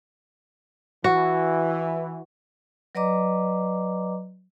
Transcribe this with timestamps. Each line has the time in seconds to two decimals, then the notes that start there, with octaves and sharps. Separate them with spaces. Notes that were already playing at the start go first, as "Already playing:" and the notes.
1.04 E3 F#4
2.95 F#3 B4 D5 D#5 A#5 D6